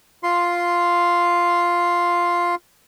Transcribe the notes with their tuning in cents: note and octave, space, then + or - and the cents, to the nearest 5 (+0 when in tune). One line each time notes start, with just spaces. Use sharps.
F4 +0 C6 +0